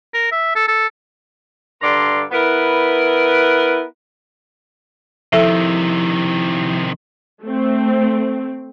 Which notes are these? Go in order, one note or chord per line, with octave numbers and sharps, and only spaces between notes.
A#4
E5
A4
A4
G2 D3 D5 A#5 C6
B3 E4 A#4 B4
C3 D#3 F3 E4 A4 E5
A3 C4